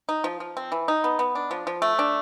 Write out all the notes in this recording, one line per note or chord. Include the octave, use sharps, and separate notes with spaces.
D#4
F3
F3
C4
E3
D#4
B3
B3
D4
F3
F3
A3
D4